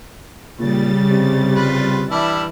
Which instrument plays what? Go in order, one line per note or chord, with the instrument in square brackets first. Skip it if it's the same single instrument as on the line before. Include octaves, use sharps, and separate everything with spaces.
[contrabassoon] A#2 [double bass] C#3 [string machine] G3 A6
[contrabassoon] C3
[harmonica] F4 B4
[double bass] E3 [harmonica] G3 D4 E4